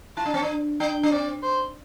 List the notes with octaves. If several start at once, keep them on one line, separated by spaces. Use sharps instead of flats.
E4 A5
D4
C4
D4
D4 G5
D4
C4 D5
C5